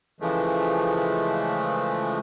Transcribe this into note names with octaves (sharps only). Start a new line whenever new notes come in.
C#3 E3 F3 G#3 A3